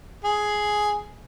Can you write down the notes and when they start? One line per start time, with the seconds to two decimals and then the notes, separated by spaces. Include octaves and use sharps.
0.24 G#4